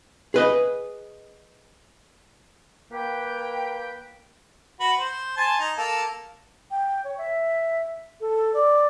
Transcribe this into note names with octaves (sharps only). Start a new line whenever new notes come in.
G#4 B4 D#5
A#3 B4 G5
F#4 B4
C5
G#5 A5 C6
D#4
A#3 A4
G5
C#5
E5
A4
D5